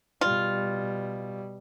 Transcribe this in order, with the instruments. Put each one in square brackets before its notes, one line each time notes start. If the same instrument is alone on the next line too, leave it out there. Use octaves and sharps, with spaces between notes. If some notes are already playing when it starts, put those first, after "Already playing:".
[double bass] B2 G3 [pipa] F4